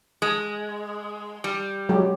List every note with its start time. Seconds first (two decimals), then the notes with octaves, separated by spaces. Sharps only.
0.22 G#3
1.44 G3
1.89 F#3 G#3 G4